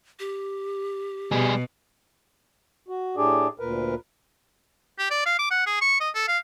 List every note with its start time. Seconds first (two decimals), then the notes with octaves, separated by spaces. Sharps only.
0.19 G4
1.32 B2 G3 G#4
2.88 F#4
3.17 A2 D4 G4 G#4 D5
3.59 D2 A#2 A#4 B4
4.99 G4
5.11 D5
5.26 F5
5.39 D6
5.51 F#5
5.67 G#4
5.81 C#6
6.00 D#5
6.15 A4
6.28 F5